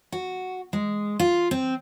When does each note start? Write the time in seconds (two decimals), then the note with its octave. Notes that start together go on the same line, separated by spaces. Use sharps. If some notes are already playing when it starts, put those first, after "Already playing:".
0.12 F#4
0.73 G#3
1.19 F4
1.51 C4